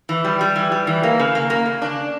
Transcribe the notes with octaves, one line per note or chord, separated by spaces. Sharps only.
E3
G3
G3
E3
G3
E3
A#3
C#3
A#3
A#3
C#3
D4